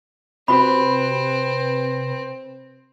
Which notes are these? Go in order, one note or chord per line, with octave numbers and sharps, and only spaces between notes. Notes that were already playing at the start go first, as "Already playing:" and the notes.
C3 C4 F#4 B4 B5